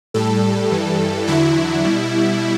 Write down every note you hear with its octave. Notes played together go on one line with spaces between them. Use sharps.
A2 G3 A4
G2 E3 G3
E2 D3 F#3 E4
B2 G3